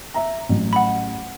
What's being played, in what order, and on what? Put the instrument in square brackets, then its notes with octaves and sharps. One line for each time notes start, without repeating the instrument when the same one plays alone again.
[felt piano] E5 A#5
A1 F#3
[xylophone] F#5 B5